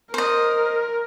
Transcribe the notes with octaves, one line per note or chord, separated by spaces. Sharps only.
A#4 C5 D#5